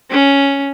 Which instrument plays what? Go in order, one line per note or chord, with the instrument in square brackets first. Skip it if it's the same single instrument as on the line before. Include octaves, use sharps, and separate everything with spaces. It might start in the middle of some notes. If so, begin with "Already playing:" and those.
[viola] C#4